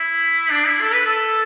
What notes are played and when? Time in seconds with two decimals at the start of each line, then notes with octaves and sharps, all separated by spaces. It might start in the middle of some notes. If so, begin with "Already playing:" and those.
Already playing: E4
0.51 D4
0.66 E4
0.81 A4
0.93 B4
1.05 A4